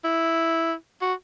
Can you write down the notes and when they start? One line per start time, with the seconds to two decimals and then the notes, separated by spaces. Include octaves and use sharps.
0.04 E4
1.02 F#4